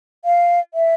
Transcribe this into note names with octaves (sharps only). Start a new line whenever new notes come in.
F5
E5